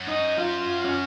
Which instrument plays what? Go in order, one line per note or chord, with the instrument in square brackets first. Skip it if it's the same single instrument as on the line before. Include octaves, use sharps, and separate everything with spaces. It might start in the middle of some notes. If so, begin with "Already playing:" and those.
Already playing: [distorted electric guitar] F#2
[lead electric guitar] D#4
F4
C#4